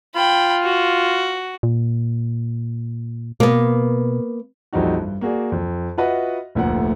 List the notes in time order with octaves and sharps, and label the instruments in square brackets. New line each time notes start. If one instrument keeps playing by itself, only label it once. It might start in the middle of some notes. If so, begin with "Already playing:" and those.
[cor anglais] F4 [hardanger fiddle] G5 B5
[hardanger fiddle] F#4
[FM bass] A#2
[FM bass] B2 [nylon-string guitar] A#3 B3
[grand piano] A#1 F2 G3 D#4 F#4
G2
A#3 F#4 G#4 D5
F2
F4 F#4 B4 D#5 E5 F#5
F1 D2 A#2 F#5